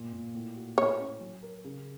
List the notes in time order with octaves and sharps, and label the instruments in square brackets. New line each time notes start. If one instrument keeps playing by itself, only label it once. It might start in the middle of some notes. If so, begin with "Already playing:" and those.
Already playing: [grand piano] A#2
A#2
A2
F#4
[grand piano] A2 [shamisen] C#5
[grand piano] C#4
F#3
A#4
C#3